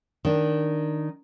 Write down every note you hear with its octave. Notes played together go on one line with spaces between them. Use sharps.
D#3 D4